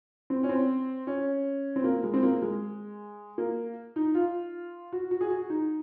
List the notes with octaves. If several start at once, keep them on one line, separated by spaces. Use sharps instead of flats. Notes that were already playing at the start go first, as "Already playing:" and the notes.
C4
C#4
C4
C#4
C4
A#3
G#3
C4
A#3
G#3
A#3
D#4
F4
F#4
F#4
G#4
F#4
D#4